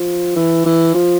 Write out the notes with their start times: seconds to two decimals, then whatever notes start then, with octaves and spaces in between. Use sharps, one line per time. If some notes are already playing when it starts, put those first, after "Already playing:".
Already playing: F3
0.36 E3
0.66 E3
0.94 F3